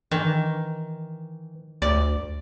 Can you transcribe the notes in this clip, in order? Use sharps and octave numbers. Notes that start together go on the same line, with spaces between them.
D#3 E3
D2 D5